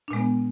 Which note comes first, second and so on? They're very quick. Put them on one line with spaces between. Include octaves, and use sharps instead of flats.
D4 A#2 G#3 B3